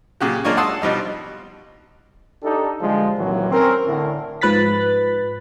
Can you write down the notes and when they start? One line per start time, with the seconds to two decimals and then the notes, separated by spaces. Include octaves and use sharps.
0.20 A#2 C#3 F#4 G4
0.44 G#3 A#3 D4 F4 C#5
0.57 F#5 A5 C6 D#6 E6
0.82 B2 F3 G3 D#4
2.43 D4 D#4 G4 A4
2.81 D3 F3 G3 G#3
3.18 C2 F2 A#2 D#3 E3 F#3
3.52 C4 C#4 A#4
3.87 A2 D3
4.41 G#2 F3 B4 F#6 A6 B6